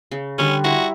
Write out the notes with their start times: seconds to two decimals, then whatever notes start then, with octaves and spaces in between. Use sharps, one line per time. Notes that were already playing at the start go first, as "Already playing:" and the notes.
0.11 C#3
0.38 D3 G3 C#4
0.64 E4 F#4 A#5 C6